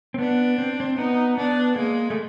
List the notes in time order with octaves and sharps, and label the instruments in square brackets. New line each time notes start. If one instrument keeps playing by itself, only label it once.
[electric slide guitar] C4
[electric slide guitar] B3 [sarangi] D4
[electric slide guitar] C4
C4
[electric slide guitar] B3 [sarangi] D#4
[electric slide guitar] B3 [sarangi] D4
[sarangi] G#3 [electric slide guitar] A#3
[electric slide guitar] A3